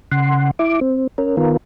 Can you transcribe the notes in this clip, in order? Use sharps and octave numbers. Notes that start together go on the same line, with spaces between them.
C#3 F#5 C6
E4 D6
C4
C#4 A#4
D#3 B3 F4 A#4